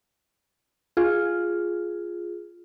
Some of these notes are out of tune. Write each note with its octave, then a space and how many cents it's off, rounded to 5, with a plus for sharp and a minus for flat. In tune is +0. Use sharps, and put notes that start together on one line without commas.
F4 +0 G#4 +0